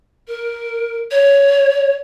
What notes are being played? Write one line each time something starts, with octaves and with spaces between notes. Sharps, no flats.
A#4
C#5